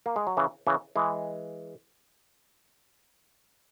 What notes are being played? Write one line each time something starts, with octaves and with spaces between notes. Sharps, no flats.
A#3
G#3
F#3
C#3 E3
C#3 E3
E3 G#3